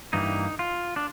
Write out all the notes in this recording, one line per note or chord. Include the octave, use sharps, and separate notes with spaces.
G2 E3 G3 A#3 D#4
F4
D4